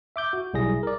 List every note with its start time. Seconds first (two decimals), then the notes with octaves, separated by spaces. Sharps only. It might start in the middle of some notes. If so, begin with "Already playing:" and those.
0.16 E5 D6 G6
0.33 F#4
0.54 B1 G3 E4 G#4 A#6
0.83 A#4 D5